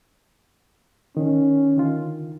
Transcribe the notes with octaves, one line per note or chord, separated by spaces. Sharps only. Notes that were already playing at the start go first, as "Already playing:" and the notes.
D#3 C#4
D3 D#3 F4